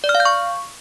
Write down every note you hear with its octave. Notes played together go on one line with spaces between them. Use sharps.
D5
F6
F5
G6
C#6